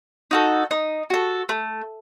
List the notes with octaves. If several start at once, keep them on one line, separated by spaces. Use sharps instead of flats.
D#4 F#4 A4
D#4
F#4 A4
A3